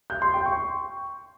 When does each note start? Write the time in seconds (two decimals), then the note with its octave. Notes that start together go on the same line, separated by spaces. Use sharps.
0.10 G6
0.22 C6
0.34 G5
0.46 C#6